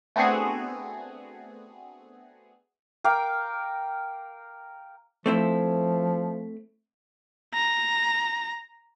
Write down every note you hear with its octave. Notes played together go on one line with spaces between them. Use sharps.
A3 B3 C4 D4 F#4 G#4
A#4 F5 G5 D6
F3 A3 C4 E4
A#5